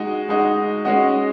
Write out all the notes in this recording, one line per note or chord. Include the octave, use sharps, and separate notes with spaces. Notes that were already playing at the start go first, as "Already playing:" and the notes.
Already playing: G#3 D#4 F#4
G#3 D#4 F#4
G#3 C#4 F#4 D#5